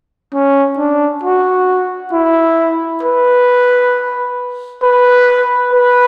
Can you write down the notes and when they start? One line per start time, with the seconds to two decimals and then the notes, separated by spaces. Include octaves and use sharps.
0.34 C#4
0.78 D4
1.23 F#4
2.12 E4
3.03 B4
4.83 B4
5.73 B4